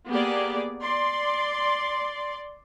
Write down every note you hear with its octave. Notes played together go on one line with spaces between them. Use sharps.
A#3 B3 G4 G#4 D5
D5 C6